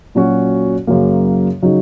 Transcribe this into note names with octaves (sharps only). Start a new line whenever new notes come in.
A#2 F#3 C#4 F#4
F#2 C#3 F#3 A#3
C#3 F#3 D#4